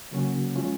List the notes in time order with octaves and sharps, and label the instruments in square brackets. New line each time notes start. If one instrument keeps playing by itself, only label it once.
[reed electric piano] C#3 F#3 A#3 C#4 F#4
F3 G#3 C#4 F4